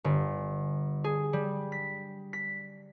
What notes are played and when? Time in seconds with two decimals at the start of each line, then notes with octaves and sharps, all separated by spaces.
0.04 G1
1.04 G#4
1.33 G3
1.72 B6
2.33 B6